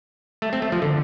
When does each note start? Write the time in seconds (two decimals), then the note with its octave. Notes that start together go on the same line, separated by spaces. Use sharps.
0.42 A3
0.53 C4
0.62 A3
0.72 F3
0.82 D3